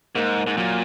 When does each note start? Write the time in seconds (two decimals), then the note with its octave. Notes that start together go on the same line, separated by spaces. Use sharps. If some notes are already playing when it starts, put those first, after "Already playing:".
0.15 G#2 A#3
0.47 G#2
0.57 A#2 F#3